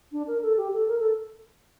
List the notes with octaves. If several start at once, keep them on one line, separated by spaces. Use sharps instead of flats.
D4
A#4
A4
G4
A4
A#4
A4